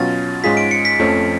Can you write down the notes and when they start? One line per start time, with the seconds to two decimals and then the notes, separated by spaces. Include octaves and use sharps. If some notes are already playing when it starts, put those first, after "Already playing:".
Already playing: B2 F#3 C#4 F4 A6
0.44 G#2 G#3 C#4 F4 G#4 B6
0.57 D7
0.71 C#7
0.85 B6
0.99 F2 F3 A3 C#4